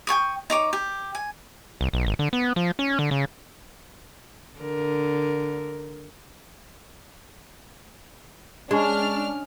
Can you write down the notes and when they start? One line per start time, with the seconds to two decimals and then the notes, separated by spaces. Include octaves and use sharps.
0.07 G5 G#5 C#6 D#6
0.50 D#4 C#5 D6
0.73 G4
1.15 G#5
1.81 C2
1.93 B1
2.07 G#1
2.19 D3
2.33 B3
2.56 F3
2.79 C#4
2.99 D3
3.11 C#3
4.59 D3 A#4
8.71 G#3 C#4 D4 D#5 F6